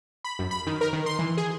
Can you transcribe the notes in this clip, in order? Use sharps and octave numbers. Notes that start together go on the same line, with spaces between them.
B5
F#2
B5
D#3
A#4
D#3
C6
E3
G#4